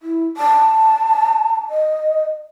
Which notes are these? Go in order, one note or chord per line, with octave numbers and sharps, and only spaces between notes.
E4
A5
D#5